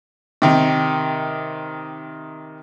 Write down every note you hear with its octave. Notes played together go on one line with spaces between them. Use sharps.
C3 D#3